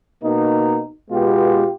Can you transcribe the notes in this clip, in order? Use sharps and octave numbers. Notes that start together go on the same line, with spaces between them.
B2 A#3 D#4
B2 G#3 B3 F4 G4